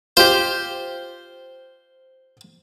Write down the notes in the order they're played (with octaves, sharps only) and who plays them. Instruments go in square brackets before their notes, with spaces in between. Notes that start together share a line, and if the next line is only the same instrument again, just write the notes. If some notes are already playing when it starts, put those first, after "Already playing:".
[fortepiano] F4 G4 [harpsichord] C5